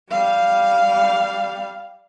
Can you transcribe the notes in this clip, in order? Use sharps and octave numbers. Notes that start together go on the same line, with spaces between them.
G3 F5